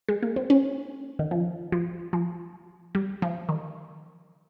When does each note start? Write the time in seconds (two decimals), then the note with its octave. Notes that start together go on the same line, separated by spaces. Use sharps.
0.09 G#3
0.22 A#3
0.36 C4
0.50 C#4
1.19 D#3
1.31 F3
1.72 F3
2.13 F3
2.95 G3
3.22 F3
3.49 D#3